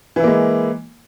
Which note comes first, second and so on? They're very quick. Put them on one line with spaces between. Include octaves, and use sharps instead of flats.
E3 E4 A#3 G#3